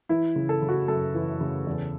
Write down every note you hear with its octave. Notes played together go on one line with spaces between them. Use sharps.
E3 E4
C#3
A4
C#3
F#4
F#2 A4
E3
C#3
E2